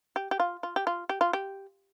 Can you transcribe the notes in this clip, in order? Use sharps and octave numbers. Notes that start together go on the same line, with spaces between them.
G4
G4
F4
F4
G4
F4
G4
F4
G4